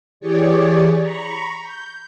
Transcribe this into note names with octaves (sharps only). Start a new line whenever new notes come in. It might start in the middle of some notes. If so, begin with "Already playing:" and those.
E3 G4 G#4 C#5 D5
A#5 B5 C#6
G6